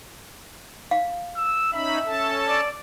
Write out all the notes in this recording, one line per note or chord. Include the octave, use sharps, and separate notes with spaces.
F5
E6
C#4 D#4 E5 B5
C#4 A4 A5
D5